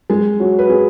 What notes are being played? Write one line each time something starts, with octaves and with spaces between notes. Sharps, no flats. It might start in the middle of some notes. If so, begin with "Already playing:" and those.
G#3
F#3
B4
G#4